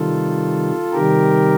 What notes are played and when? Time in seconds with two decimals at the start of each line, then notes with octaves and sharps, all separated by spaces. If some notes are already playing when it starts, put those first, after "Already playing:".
Already playing: C3 D#3 G3 F4 A4
0.92 C3 D#3 G3 G4 A#4